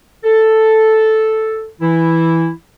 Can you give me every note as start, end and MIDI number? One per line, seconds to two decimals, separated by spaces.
0.24 1.68 69
1.81 2.49 52
1.81 2.49 64